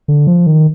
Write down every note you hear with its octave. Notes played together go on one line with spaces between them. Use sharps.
D3
F3
D#3